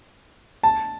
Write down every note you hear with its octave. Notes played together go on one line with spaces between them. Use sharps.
A5